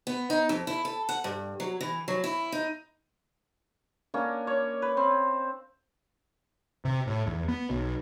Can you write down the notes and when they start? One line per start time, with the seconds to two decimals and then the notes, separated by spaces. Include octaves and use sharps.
0.07 B3
0.30 D#4
0.49 F2
0.67 E4
0.85 A4
1.09 F#5
1.24 G2
1.60 F#3
1.81 E3
2.08 F#3
2.24 E4
2.52 D#4
4.14 A#3 C#4 D4
4.47 C#5
4.82 B4
4.97 C4
6.85 C3
7.07 A2
7.27 E2
7.48 B3
7.70 B1